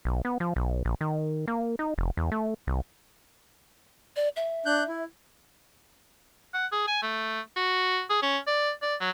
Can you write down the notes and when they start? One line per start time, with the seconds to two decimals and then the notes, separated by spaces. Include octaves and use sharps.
0.05 B1
0.25 B3
0.40 F3
0.56 B1
0.85 A#1
1.01 D#3
1.48 A#3
1.79 D#4
1.98 F1
2.17 E2
2.32 A3
2.67 C2
4.16 D5
4.36 E5
4.66 D4 F#6 G6
4.88 E4
6.54 F#5
6.72 G#4
6.87 G#5
7.02 A3
7.56 F#4
8.10 G#4
8.22 C#4
8.47 D5
8.82 D5
9.01 F#3